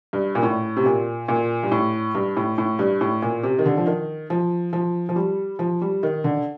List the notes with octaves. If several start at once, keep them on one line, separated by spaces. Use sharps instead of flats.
G2
A#2
A2
C3
A#2
A#2
G2
A2
G2
A2
A2
G2
A2
A#2
C3
D#3
D3
F3
D#3
F3
F3
F3
G3
F3
G3
D#3
D3